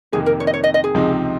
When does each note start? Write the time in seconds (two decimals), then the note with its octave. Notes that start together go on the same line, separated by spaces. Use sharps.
0.12 F2 C3 D#3 A#3 G#4
0.26 A#4
0.40 C#5
0.47 D#5
0.54 C#5
0.64 D#5
0.74 D#5
0.84 G#4
0.94 C#2 C3 F3 C4 D#4